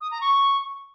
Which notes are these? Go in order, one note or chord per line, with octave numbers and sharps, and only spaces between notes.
D#6
A#5
C#6